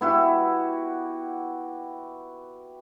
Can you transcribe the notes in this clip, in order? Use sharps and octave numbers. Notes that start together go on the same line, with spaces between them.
B3 E4 F#4 G4